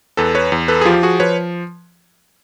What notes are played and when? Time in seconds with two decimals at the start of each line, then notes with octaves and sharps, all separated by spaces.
0.17 E2 A4 B4
0.35 B4 C#5
0.52 E2
0.68 A4 B4
0.81 G#4
0.85 F3 F4 G4
1.03 F#4 G#4
1.20 F3 B4 C#5